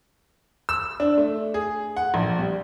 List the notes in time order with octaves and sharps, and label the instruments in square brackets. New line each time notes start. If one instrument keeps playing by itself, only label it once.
[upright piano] E6
D4
A3
G#4
F#5
A#1
G3